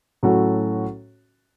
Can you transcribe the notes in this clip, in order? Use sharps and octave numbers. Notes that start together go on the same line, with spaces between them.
A2 F#3 C#4 F#4 A4